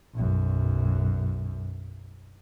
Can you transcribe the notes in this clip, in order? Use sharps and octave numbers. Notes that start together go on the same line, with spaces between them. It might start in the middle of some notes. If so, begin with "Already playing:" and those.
B1 F#2